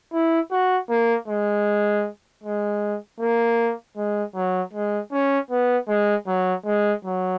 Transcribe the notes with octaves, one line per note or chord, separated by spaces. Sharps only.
E4
F#4
A#3
G#3
G#3
A#3
G#3
F#3
G#3
C#4
B3
G#3
F#3
G#3
F#3